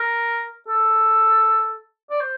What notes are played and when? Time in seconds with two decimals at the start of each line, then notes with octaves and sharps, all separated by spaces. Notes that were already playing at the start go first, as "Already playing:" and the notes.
Already playing: A#4
0.68 A4
2.10 D5
2.21 C5